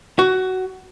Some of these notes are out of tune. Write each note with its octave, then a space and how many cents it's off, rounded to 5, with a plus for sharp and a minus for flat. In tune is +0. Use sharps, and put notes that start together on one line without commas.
F#4 +15